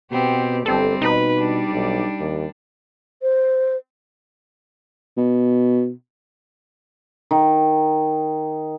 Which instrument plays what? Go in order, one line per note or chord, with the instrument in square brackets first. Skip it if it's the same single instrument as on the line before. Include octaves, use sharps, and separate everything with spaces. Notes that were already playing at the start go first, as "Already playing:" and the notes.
[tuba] B2 [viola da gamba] B3 C4 G4
[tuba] G1 [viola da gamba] G3 C4 [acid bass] A4
[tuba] B2 [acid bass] D#4 [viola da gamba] B4
[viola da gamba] G3 D4
[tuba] B1
D#2
[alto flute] C5
[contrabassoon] B2
[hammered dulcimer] D#3